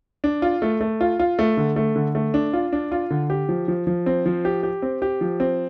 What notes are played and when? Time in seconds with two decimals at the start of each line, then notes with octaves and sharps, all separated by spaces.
0.24 D4
0.42 F4
0.62 A3
0.81 A3
1.01 F4
1.19 F4
1.39 A3
1.57 D3
1.76 A3
1.96 D3
2.15 A3
2.34 D4
2.53 F4
2.73 D4
2.92 F4
3.10 D3
3.30 G4
3.49 F3
3.68 F3
3.87 F3
4.06 C4
4.26 F3
4.45 G4
4.63 G4
4.82 C4
5.02 G4
5.21 F3
5.40 C4